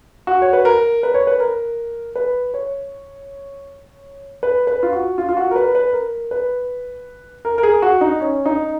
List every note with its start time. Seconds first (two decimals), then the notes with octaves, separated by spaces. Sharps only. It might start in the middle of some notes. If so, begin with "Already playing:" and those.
0.27 F#4
0.42 C#5
0.53 B4
0.65 A#4
1.03 B4
1.14 C#5
1.27 B4
1.40 A#4
2.16 B4
2.54 C#5
4.43 B4
4.67 B4
4.83 F4
4.92 F#4
5.18 F4
5.29 F4
5.37 F#4
5.51 A#4
5.56 B4
5.75 B4
5.93 A#4
6.31 B4
7.45 A#4
7.58 A#4
7.63 G#4
7.82 F#4
8.01 D#4
8.20 C#4
8.45 D#4